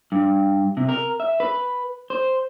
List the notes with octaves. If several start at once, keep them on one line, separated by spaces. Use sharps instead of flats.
G2
C3
A#4
E5
B4
C5